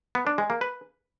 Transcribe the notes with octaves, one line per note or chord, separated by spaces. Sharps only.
B3
D4
G#3
A#3
B4